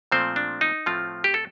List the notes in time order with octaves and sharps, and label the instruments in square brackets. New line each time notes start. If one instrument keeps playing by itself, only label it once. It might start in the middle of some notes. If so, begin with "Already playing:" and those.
[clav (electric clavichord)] A#2 F3 A3 C4 C5
D4
D#4
A2 F3 A3 C4 F4
G4
A4